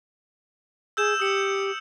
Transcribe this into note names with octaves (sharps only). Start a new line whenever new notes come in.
G#4 E6 G6 E7
G4 D#6 C#7